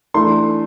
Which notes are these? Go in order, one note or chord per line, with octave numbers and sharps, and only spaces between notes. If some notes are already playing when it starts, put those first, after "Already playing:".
E3 A3 D4 C6